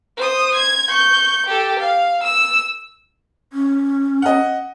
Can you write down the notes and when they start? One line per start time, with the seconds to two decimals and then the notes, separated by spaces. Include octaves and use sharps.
0.17 C5 D#6
0.55 G#6
0.89 C#6 G6
1.47 G4 A4
1.79 F5
2.23 E6
3.53 C#4
4.22 D#5 F#5